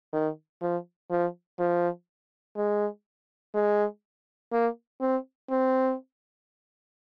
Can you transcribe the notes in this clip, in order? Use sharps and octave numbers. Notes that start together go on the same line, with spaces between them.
D#3
F3
F3
F3
G#3
G#3
A#3
C4
C4